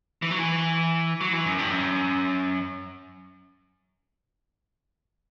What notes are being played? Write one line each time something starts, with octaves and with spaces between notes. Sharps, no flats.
E3
F#3
E3
F#3
E3
F#2
G2
F#2